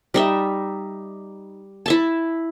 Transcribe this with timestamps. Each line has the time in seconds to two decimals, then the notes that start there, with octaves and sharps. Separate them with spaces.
0.14 G3 D#4 E5
1.86 E4 E5 A5